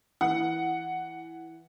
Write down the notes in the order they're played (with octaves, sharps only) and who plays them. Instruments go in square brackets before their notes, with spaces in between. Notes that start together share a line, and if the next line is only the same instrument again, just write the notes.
[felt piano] E3 [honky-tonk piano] F#5